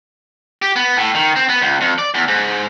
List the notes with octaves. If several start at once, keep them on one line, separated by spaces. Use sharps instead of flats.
G4
B3
A2
D#3
C4
B3
C#2
F2
D5
E2
G#2